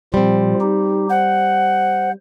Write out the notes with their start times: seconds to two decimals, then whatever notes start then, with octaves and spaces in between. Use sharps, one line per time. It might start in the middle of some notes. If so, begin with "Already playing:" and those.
0.14 A#2 F3 G3 C4 F4
0.60 D#4 G4
1.10 C5 F#5